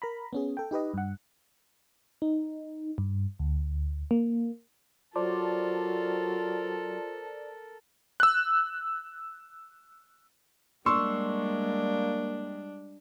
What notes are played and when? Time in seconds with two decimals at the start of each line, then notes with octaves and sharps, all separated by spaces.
0.02 A#4 A#5 B5
0.33 B3 C#4 G#4
0.57 A4 G5
0.71 D#4 G4 B4 D#5
0.94 G2 F#5
2.22 D#4
2.98 G2
3.40 D2
4.11 A#3
5.16 F#3 F4 A4 A#4 C5 D5 A5
8.20 E6 F#6
10.86 G3 G#3 A#3 D4 C6 C#6 E6